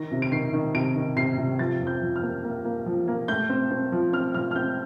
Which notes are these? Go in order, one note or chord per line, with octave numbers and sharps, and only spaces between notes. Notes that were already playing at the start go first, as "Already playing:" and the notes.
Already playing: D#3 A#6
C3
D7
D#3 C7
D#3
C3 D7
D#3
C3 C7
C3
F3 A6
F2
G6
F3
F6
A#3
A#3
A#3
F3
A#3
A3 G6
C4
C4
F3
C4 F6
F3 F6
F6
C4 G6